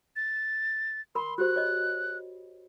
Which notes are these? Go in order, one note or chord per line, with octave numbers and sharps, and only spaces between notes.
A6
A#4 B5 C6
F#4 G4 C5 F#6
C#5 D#5